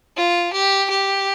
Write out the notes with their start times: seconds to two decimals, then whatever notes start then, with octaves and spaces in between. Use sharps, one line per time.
0.17 F4
0.53 G4
0.90 G4